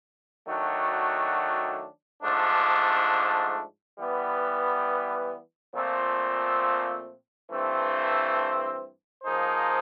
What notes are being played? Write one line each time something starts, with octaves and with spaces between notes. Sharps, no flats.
D#3 F#3 A3 D4 F#4
G#2 F3 A3 D4
E3 G3 B3
A#2 F3 A3 C4
G2 E3 A3 C4
F3 A#3 D#4 G#4 C5